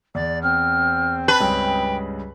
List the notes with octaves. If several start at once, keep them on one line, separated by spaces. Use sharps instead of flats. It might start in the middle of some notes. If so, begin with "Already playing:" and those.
E2 D5
C4 F6
B4 A5
C#2 G2 C#3 G5